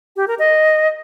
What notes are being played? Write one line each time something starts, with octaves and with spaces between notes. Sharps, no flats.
G4
A#4
D#5